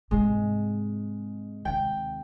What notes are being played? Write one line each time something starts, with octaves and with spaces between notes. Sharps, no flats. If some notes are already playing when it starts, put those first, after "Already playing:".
G#2 C3 G#3
D#2 C3 G5